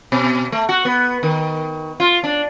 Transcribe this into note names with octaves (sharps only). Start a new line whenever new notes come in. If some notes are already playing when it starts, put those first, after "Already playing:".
B2
A3
F#4
B3
D#3
F4
D4